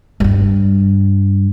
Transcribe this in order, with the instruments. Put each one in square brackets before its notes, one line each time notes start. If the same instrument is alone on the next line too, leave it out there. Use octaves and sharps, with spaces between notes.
[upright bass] G2 G3